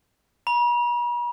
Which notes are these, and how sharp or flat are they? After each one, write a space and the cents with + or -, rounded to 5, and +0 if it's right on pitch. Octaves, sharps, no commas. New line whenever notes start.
B5 -45